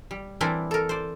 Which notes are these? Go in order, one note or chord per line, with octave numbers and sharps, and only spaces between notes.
G3
E3 C4 D4 E4 A#4 D5
A4 A#4
C5 D5